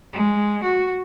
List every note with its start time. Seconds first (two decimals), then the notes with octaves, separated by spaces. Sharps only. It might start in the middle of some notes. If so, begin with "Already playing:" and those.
0.13 G#3
0.63 F#4